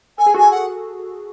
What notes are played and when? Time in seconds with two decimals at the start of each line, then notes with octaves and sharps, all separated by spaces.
0.18 A4 G#5
0.26 G#4
0.34 F#4 A4 G#5
0.51 F#5